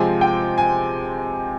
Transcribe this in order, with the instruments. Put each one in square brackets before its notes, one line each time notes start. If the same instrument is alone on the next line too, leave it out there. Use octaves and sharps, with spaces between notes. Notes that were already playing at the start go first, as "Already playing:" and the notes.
Already playing: [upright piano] C3 F3 G#3 C4 G#5
G5
G#5